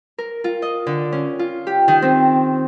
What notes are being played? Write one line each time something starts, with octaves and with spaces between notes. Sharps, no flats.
A#4
F4
D#5
D3
C#4
F4
G4
D#3
C4